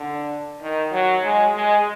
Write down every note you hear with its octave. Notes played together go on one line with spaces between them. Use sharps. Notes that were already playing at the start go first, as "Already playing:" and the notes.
Already playing: D3
D#3
F#3
G#3
G#3